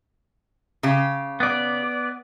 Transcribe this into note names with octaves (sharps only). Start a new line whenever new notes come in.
C#3 G4
B3 D5